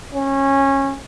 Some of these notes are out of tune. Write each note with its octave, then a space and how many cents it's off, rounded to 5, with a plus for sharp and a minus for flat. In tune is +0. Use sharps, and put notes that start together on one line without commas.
C#4 -20